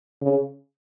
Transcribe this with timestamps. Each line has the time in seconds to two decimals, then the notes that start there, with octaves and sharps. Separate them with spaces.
0.21 C#3